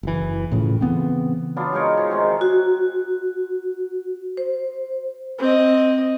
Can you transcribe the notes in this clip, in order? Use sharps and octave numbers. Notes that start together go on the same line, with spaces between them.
F#1 E3
A2 C#3 F3
C#3 E3 B3 C4
F#3 B3 D4 F4
G#3 D#4 A#4 C#5
F3
C3 D#3 G#3
F#4
C5
C4 D#5